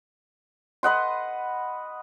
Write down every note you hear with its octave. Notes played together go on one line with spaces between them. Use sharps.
B4 D#5 F#5 C6